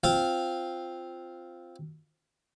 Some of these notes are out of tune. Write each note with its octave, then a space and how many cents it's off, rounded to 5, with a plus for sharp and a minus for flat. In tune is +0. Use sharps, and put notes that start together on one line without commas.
C4 +0 F4 +0 F5 +0